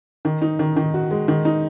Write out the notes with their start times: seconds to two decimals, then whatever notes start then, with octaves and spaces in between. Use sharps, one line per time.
0.25 D#3
0.42 D#4
0.59 D#3
0.76 D#3
0.94 F#4
1.11 G#3
1.28 D#3
1.45 D#4